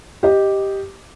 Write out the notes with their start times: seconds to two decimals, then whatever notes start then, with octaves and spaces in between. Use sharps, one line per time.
0.23 G4 D#5